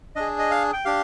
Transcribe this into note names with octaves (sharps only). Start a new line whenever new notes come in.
D4 G#4 D#5
D#5
F5
G5
D4 G4 F5